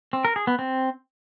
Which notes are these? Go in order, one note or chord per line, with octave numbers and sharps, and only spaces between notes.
C4
A#4
G#4
B3
C4